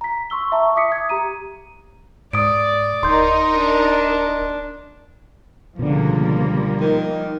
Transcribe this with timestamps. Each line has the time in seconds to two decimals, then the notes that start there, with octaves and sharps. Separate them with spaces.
0.01 A#5 B6
0.30 C6 C#6 E6 G7
0.52 E5 A5 A#5 C#6
0.76 E5 D6 D#6 B6 C#7
0.92 D#6 G#6
1.09 G4 A#5 D#7
2.33 G#2 D5 D#6 D7
3.03 D1 D#4 A#4 C6 G6
3.55 D4
5.79 C#2 B2 D3 F3 G3 A#3
6.81 D#3